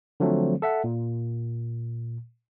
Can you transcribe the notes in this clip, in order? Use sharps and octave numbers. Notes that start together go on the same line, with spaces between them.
D3 F3 F#3 A3 C4
A4 E5 F#5
A#2